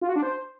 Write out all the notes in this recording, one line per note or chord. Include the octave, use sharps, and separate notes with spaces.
F4
F#4
D4
C5